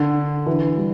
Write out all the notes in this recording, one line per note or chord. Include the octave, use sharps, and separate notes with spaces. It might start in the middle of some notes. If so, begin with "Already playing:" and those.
Already playing: D3
E3
G3